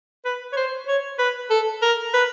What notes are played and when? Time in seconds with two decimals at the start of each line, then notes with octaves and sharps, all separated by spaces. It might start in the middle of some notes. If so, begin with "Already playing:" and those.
0.25 B4
0.53 C#5
0.57 C5
0.87 C#5
1.19 B4
1.50 A4
1.82 A#4
2.13 B4